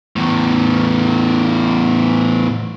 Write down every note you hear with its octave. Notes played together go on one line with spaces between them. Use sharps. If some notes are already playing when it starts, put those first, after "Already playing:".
E2 A2